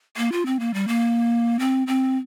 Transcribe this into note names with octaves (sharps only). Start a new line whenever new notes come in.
A#3
F4
C4
A#3
G3
A#3
C4
C4